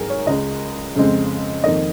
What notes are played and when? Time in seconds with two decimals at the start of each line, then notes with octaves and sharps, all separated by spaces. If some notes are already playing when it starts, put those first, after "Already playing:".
Already playing: G#1 G#2 F#3 A#3 G#4 A#4
0.10 C#5
0.26 C#2 C#3 G#3 D#5
0.95 F2 C#3 G#3 C4
1.64 F2 D#3 A#3 D#5